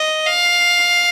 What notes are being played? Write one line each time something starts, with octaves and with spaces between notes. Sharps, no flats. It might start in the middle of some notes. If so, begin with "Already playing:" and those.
Already playing: D#5
F5